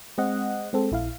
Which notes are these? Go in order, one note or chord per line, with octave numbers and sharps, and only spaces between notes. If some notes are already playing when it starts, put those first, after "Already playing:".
G#3 C4 D#5 F#5
G#3 C4 A4
A#1 E4 F5